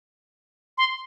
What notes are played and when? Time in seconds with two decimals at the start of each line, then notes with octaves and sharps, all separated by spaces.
0.78 C6